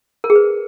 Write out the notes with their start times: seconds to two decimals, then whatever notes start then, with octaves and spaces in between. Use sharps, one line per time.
0.24 A#4
0.30 G#4
0.36 B4